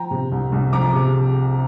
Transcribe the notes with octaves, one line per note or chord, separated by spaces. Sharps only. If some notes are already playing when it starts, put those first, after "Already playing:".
Already playing: F3 G5 A#5
C3
C2
C2
F3 A#5 D6
C3